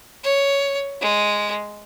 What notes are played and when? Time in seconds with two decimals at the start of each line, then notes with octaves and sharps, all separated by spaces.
0.23 C#5
1.01 G#3